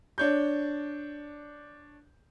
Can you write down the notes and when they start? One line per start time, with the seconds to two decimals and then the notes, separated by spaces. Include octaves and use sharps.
0.18 D4 C#5 G6